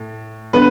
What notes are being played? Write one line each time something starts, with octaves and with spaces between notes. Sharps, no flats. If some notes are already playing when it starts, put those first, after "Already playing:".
Already playing: A2
D3 B3 B4